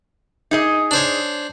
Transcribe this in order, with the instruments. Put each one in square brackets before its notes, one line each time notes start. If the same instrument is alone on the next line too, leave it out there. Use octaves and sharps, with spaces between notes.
[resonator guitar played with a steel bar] D#4 G#4 D#5
[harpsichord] D4 C5 C#5